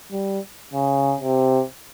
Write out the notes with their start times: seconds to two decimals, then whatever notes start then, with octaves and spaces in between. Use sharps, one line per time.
0.11 G3
0.73 C#3
1.20 C3